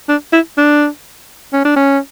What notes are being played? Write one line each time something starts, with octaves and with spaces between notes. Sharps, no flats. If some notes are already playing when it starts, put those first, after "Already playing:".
D4
E4
D4
C#4
D4
C#4